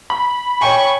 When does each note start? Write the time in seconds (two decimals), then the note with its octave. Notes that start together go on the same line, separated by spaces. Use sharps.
0.10 B5
0.61 C#5 G5 G#5 C#6